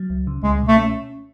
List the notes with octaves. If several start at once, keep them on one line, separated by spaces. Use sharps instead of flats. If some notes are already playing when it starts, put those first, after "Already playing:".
Already playing: F#3
C#2
C#3
C#2 G#3
B2
A3
C#4